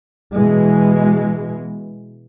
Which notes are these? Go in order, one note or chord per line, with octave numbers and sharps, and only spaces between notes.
B2 E3 G#3